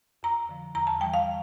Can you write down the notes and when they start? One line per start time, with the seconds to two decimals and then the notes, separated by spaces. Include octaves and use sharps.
0.23 F2 A#5
0.49 D3 F3
0.75 E2 A#5
0.87 A5
1.00 G3 G5
1.04 E3
1.14 F5